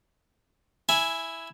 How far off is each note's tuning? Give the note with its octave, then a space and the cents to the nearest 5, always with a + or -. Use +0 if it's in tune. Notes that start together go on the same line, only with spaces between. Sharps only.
E4 +0 G#5 +0